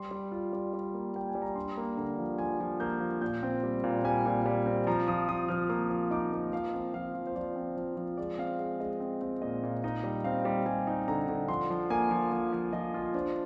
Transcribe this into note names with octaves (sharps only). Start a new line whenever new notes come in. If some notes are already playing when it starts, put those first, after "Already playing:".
Already playing: G3 C6
G3
F4
G3
G3
A#3
A#3 G5
G#5
G3
A#5
D4 C6
A#3
D3 A#5
F3
F3 G#5
F3
A#3 G6
F3
A#2 G6
C4
G3
A#2
G3 G#5
A#2
G3
C4
F3 A#5
F3 D#6
F3 D#6
F3 F6
A#3 D#6
F3
D#4 D6
A#3
F3 F5
C4
F3 F5
F3
C5
F3 D5
C4
F3 C5
F3
G#3 D5
C4 F5
G#3 F5
G#3 D#5
C4
C4
A#2 D#5
A#2
D#4 D#5
G3
C4 F5
G3
G3 G#5
D#4
D3 A#5
D3
F3 C6
F3
A#3 G#5
F3
F3
F3
F3 D#5
F4
D4 C5